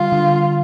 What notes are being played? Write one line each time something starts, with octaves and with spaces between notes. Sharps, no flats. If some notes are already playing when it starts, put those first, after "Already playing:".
Already playing: D3 G3 F4
D3